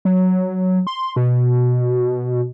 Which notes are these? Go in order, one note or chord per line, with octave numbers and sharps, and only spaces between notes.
F#3
C6
B2